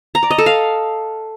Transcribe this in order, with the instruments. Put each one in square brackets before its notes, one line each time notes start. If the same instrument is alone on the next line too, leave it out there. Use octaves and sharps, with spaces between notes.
[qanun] A#5
D5
D#5
A4
F5